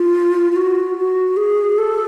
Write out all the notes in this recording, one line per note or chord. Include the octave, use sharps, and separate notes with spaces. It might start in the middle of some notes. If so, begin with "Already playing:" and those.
Already playing: F4
F4
F#4
F#4
G#4
A4